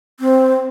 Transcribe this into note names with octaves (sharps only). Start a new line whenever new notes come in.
C4